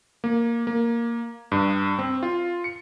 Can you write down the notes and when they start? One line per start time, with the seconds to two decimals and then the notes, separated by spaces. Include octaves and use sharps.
0.24 A#3
0.67 A#3
1.52 G2
1.99 C4
2.23 F4
2.64 C#7